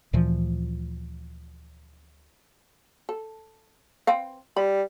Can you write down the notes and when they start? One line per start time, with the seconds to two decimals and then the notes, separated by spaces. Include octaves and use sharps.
0.13 D2 A#2 E3 F3
3.09 A4
4.07 C4 B4 F5
4.57 G3 B5